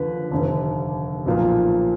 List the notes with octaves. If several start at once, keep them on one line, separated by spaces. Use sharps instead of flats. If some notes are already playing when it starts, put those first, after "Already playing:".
Already playing: D#2 D3 F3 B4
F1 D#2 D3
B1 A#2 F3